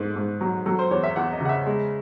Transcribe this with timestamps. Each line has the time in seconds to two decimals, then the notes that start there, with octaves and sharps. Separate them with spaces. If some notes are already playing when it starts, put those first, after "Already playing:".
Already playing: G#2 A3
0.16 G#2
0.41 F#3
0.66 F#3 A4
0.79 C5
0.91 E2 C#5
1.03 E5
1.16 E2 F#5
1.33 D#5
1.41 C#3 F#5
1.49 E5
1.66 G#3